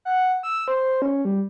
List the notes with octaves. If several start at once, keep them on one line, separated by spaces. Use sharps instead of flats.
F#5
E6
C5
C#4
G3